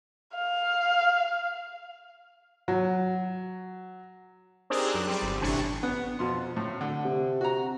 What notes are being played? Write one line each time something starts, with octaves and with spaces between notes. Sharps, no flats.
F5
F#3
C4 D4 D#4 G4 G#4 A#4
F#2 F#6
G3 C4 D5
G1
A1 A2 C3 E3 D4 C#6
B3
F2 B2 C6
A2
D3
C3
F#4 A#5